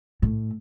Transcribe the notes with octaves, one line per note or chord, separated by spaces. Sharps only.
A2